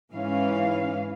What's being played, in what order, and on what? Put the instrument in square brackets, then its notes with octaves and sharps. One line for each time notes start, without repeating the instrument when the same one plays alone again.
[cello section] G#2 E3 C#4 F5